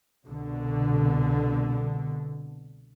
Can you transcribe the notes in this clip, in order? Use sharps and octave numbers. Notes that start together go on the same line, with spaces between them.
C2 B2 D3